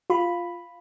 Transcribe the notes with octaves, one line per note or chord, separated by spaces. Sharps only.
F4 B5